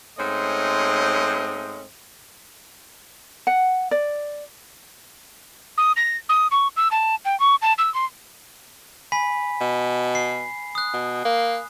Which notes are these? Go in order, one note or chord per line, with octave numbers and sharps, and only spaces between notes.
G#2 A3 C4 C#4 D#5
F#5
D5
D#6
A#6
D#6
C#6
E6
A5
G5
C#6
A5
E6
C6
G#5 B5 B6
B2
C7
D#6 F#6
B2
A#3